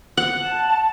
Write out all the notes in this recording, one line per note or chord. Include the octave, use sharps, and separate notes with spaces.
F#5
A5